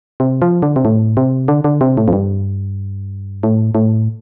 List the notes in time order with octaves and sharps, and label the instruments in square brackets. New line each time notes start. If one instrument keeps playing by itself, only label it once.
[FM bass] C3
F3
D3
C3
A2
C3
D3
D3
C3
A2
F2
G2
A2
A2